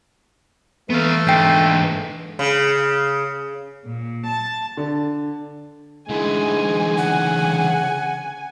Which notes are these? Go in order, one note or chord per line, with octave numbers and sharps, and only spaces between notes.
E3 A3 B3 F5
G#2 D3 G5 G6
C#3
A#2
A5
D3
D3 E3 G#3 G#5
C#3 F#5